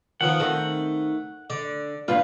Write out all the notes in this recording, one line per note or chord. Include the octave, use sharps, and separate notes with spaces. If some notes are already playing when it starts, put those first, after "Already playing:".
D#3 F3 B3 F#5
D#3 A3 C4 D#4
D3 D5
G2 A#3 D4 F4 B4